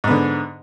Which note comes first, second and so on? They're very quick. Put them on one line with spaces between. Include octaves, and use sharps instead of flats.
G#2 B3 D3